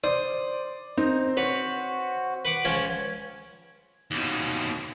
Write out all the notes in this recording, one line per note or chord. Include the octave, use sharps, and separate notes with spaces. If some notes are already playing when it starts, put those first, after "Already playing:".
C5 D5 D#6
C4 D#4
F#4 B4 C#5
B4 F#5 D6
C#2 F3 C#4 C#5
D#2 B2